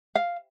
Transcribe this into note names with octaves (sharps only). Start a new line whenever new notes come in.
F5